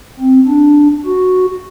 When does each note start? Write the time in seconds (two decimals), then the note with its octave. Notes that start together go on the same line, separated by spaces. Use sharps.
0.19 C4
0.48 D4
1.06 F#4